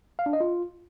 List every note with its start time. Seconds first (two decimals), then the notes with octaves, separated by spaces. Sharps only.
0.19 F5
0.26 D4
0.33 D#5
0.40 F4